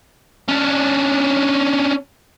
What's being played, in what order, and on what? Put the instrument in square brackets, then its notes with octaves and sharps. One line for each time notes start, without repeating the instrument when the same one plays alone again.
[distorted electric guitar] C#4 D4